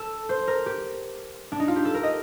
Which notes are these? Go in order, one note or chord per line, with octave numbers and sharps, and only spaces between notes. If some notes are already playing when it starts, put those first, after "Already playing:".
Already playing: A4
C5
A#4
G4
D4
D#4
F4
G4
A4
A#4
D#5